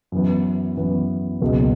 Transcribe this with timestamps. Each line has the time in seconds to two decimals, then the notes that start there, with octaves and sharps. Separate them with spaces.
0.12 F#2 E3 B3
0.77 F#2 E3 B3
1.41 C#2 B2 F#3 A#3